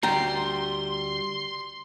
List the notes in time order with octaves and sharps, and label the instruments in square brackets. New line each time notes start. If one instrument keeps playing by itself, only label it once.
[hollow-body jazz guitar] D2 G3 G5 [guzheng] A#5 [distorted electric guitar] C6